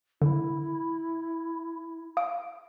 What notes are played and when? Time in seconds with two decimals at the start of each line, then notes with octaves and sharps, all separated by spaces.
0.22 D3 E4
2.17 F5 D#6 D7